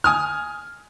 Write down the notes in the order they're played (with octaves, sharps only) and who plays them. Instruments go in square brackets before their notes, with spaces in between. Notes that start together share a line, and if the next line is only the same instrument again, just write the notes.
[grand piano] G#5 D#6 F6